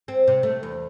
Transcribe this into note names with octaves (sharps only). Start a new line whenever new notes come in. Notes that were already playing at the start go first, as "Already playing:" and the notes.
C4
C3
A3
E2